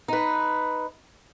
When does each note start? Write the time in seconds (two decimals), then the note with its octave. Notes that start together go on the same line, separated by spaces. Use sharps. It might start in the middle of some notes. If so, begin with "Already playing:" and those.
0.08 D#4 B4